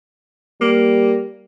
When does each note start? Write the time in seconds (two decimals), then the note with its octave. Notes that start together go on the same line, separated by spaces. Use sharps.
0.61 G3 A#3